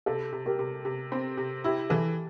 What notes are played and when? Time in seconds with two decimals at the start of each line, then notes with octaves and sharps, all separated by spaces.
0.06 C3 A4
0.33 C3
0.46 G4 A#4
0.59 C3
0.85 C3
1.12 C4
1.37 C3
1.64 E4 G4
1.90 E3 A4